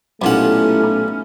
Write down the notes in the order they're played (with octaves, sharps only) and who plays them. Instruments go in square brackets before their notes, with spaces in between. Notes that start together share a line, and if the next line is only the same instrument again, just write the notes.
[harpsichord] B1 A#2 F#5 [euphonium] A3 [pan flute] C#4 [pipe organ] D#4 E4 G4